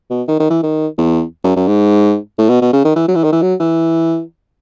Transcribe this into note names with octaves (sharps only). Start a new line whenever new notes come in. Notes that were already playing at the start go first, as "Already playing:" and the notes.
B2
D#3
D#3
E3
D#3
E2
F#2
F#2
G#2
A2
B2
B2
C#3
D#3
E3
F#3
E3
D#3
E3
F#3
E3